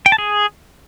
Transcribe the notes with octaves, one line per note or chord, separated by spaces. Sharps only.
G5
A5
G#4